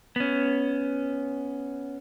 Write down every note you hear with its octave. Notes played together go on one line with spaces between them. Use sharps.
B3 C#4